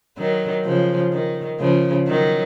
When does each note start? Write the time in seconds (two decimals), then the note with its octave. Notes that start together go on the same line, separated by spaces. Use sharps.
0.18 D#3 F#3
0.65 C#3 F3
1.12 D#3
1.60 C#3 F3
2.07 D#3 F#3